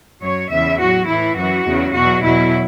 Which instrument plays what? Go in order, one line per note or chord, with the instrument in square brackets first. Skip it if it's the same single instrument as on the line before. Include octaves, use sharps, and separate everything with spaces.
[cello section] F#2 F#3 C#5
E2 C#3 E3 E5
A2 F#3 F#4
A2 E3 E4
F#2 E3 F#4
E2 C#3 F#3
E2 B2 F#3 F#4
E2 B2 F#3 E4